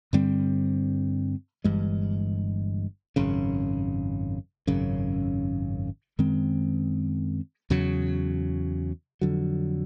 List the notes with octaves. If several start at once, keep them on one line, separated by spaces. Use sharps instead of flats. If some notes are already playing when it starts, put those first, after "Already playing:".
G2 D3 G3 C4
G1 G2 E3 G#3
G#1 F#2 C#3
G#1 F#2 C#3
F#2 D#3 G#3 C4
E2 C#3 F#3
F2 D3 F#3